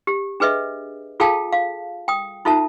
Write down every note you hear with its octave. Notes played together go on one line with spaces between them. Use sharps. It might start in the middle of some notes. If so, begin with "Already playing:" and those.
G4
D4 G#4 B4 D#5 E5
F4 G#4 A4 F5 G5 A5
F5
G5 D#6
D#4 F4 A4 E5 A5